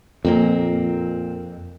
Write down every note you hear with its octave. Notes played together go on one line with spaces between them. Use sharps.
F2 A#2 A#3 C4